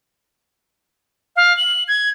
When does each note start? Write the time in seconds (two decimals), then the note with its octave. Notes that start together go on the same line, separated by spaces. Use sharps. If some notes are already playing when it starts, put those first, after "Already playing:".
1.36 F5
1.57 F#7
1.88 G#6